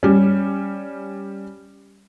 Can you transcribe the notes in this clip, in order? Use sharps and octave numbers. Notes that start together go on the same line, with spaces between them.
G3 C#4